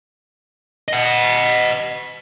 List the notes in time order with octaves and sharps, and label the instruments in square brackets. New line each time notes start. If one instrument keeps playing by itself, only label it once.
[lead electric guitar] D#5 F#5